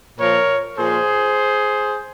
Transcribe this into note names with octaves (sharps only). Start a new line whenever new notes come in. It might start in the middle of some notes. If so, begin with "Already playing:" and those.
A#2 F3 A#4 C#5
A#2 F3 G#4 C5